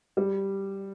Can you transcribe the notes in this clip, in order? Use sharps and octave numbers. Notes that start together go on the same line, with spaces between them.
G3